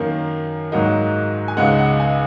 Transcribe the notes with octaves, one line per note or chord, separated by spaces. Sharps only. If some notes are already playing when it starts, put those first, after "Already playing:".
Already playing: F#2 D#3 A#3
G#2 F#3 A#3 D#4
G#5
C#2 C#3 G#3 D#4 F#5
F#5
G#5